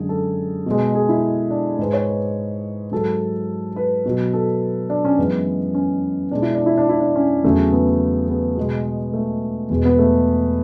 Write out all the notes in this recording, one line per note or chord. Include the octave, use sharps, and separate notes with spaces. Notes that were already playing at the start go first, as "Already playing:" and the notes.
Already playing: F#2 D3 G#3 G#4
A4
B2 G#3
G#4
E4
D4
G#2 G#3 B4
C#5
B4
G#2 F#3 A4
B4
B2 F#3
A4
D4
C#4
F#2 E3 G#3 B3
C#4
B2 G#3 D4
E4
D4
E4
D4
E4
D4
C#4
E2 C#3 F#3 A3
B3
B3
B2 G#3
A3
E2 B2 G#3
B3
A3